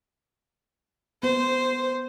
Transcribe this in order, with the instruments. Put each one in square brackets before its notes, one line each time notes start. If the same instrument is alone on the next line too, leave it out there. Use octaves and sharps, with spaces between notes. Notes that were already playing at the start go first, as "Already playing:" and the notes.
[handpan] B3 [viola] C5